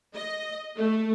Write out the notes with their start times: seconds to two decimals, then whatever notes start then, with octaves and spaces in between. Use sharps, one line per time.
0.14 D#5
0.76 A3